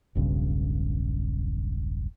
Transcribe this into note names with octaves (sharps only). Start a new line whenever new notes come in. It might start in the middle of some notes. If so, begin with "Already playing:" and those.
E1 B1 G2 C#3